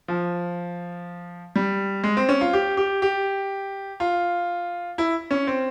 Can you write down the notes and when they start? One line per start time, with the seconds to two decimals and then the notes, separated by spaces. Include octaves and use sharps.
0.08 F3
1.56 G3
2.04 G#3
2.17 C4
2.29 C#4
2.41 F4
2.53 G4
2.77 G4
3.02 G4
4.00 F4
4.98 E4
5.31 C#4
5.47 C4